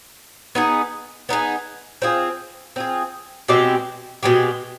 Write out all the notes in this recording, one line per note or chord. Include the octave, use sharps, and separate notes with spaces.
B3 D#4 G#4
B3 D#4 G#4
C4 F4 G#4
C4 F4 G#4
B2 G#3 C4 G4
B2 G#3 C4 G4